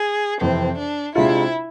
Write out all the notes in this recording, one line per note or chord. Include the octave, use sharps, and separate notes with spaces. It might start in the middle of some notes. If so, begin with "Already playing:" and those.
Already playing: G#4
F2 C3 E3 C4
D4
C3 G#3 D4 E4 F4